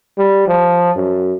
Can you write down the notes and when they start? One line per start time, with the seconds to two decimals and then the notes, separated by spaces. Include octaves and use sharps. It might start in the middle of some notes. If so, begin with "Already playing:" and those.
0.18 G3
0.48 F3
0.97 F#2